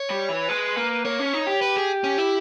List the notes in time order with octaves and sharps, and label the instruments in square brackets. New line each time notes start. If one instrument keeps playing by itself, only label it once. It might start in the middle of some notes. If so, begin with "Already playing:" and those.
Already playing: [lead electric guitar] C#5
[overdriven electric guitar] G3
E3
[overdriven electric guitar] G#3 [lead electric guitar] B4
[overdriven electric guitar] A#3
[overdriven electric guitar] A#3 [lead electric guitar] C#5
[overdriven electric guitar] C#4
D#4
G4
[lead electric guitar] B4
G#4
C#4
E4